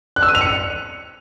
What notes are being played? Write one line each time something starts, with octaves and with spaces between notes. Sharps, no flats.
F#6
E6
D#7
F7
C#7